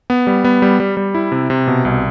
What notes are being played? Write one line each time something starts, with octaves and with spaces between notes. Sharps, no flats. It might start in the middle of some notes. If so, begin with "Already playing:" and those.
B3
G3
B3
G3
G3
G3
E4
C3
C3
B2
C2